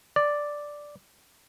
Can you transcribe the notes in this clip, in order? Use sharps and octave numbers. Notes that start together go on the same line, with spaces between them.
D5